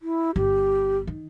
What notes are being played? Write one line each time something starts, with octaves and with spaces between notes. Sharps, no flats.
E4
G1 G4
D#3